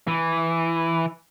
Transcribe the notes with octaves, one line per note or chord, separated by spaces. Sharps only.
E3